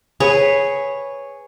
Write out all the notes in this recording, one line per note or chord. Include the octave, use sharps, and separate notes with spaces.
G#4 B4 C#5